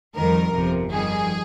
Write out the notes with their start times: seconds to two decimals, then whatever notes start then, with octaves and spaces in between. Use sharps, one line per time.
0.16 F2 D#3 G3 A#4
0.53 G1 F2 C3 F3
0.90 F2 D#3 G3 G#4